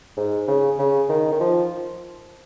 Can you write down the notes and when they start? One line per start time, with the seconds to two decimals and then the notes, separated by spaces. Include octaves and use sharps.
0.17 G#2
0.48 C#3
0.79 C#3
1.09 D#3
1.32 D#3
1.41 F3